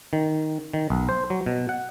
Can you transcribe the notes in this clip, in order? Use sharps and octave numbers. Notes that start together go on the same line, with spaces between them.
D#3
D#3
B1
C5
F#3
B2
F#5